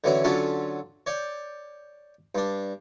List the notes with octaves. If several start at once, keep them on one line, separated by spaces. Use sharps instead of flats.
D3 E3 F#3 C#4
D3 F#3 C#4 F4 A4
C#5 D5 G5
G2 D4